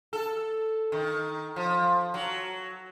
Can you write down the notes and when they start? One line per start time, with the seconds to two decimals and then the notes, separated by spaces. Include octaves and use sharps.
0.13 A4
0.92 D#3
1.56 F3
2.14 F#3